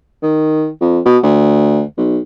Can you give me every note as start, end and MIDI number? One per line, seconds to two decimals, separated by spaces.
0.23 0.68 51
0.81 0.99 41
1.05 1.18 47
1.23 1.82 38
1.97 2.19 35